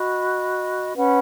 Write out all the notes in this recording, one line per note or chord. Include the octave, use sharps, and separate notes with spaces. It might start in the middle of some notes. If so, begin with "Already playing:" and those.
Already playing: F#4 D#5 B5
C#4 B4 F#5 B5